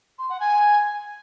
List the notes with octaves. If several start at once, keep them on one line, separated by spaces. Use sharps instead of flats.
C6
F#5
G#5